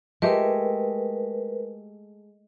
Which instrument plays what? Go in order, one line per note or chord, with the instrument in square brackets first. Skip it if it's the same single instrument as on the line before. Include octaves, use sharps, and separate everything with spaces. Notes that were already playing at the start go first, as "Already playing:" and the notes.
[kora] G#3 A3 G4 [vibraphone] A#4 B4